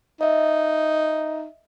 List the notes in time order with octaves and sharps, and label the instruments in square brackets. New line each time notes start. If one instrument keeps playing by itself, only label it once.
[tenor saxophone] D#4 [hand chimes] D#5 E5